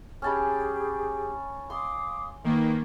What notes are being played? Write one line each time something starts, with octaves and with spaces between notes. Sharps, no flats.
C#4 G4 G#4 A5 B5
F5 C6 D6 D#6
D#3 A#3 A#4 B4 F5